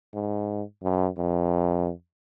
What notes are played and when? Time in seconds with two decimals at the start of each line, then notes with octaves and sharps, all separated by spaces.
0.14 G#2
0.83 F#2
1.18 F2